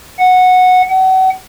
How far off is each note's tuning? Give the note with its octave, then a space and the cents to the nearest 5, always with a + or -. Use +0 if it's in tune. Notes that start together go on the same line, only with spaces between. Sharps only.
F#5 -10
F#5 +35